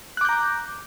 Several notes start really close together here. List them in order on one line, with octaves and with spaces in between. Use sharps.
F#6 D6 G6 A#5